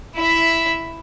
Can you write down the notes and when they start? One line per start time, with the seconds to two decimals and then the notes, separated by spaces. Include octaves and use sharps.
0.15 E4 E5